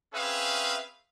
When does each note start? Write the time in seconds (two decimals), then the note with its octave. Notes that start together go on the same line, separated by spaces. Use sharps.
0.13 C4 C#4 G#4 B4 E5 F5